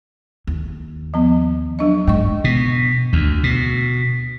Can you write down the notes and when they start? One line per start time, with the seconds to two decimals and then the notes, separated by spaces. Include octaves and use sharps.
0.47 D#2
1.14 F3 B3
1.79 F#3 D4 D#5
2.07 G#2 G#3 D#5 C#6
2.44 B2
3.13 D2
3.43 B2